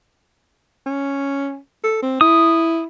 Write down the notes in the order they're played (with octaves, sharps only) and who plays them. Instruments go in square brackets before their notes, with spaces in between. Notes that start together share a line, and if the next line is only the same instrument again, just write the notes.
[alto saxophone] C#4
A4
C4
[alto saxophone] E4 [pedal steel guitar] D#6